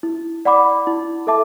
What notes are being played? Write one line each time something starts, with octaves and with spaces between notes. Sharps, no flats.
E4
D5 F#5 B5 D6
E4
A4 E5 A5 D6